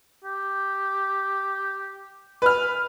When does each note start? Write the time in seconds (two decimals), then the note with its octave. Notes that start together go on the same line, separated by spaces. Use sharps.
0.24 G4
2.42 B4 F6